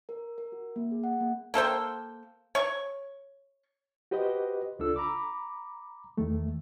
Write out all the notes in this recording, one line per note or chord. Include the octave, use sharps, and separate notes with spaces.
A#4
A#4
F#4
A#3
G#4
F#5
A#3
A#3 A4 C5 G5
C#5 C#6
F#4 G4 B4 C5 D#5
C#2 D4 F4 A4 E6
A#5 B5 D6
E2 D#3 A3